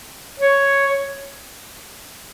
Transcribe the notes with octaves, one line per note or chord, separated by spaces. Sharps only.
C#5